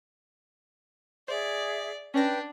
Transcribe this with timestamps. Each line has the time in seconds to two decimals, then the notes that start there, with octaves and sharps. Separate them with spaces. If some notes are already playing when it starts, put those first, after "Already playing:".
1.28 G#4 C5 D5 E5
2.14 C#4 D4 B4 G5 G6 A#6